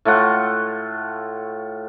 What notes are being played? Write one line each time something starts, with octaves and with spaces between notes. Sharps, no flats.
A2 A3 F4 F#5